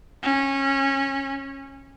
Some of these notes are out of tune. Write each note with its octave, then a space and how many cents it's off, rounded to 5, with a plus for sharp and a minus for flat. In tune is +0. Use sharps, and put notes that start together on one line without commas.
C#4 -20